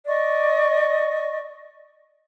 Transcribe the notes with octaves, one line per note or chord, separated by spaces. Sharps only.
D5 D#5 C#6